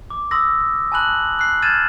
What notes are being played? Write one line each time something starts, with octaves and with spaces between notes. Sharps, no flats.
D6
C6 D#6 E6 A#6
G#5 A5 B5 F#6 F#7
F#6 C7
F6 G#6 A6 D#7 E7